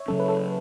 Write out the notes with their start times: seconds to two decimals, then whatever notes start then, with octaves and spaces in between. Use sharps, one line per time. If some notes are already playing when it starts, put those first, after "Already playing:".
Already playing: C#5 E5
0.08 C#3 F#3 C#4 A4
0.20 B4
0.29 A4